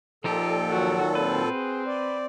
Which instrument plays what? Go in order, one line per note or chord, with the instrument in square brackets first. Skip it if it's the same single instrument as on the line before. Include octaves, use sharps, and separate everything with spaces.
[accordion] A#2 A4 [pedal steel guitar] F3 D#4 G4
[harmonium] D#3 F#3 [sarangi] F#4
[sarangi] C4 [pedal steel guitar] B4
[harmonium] G#4
D5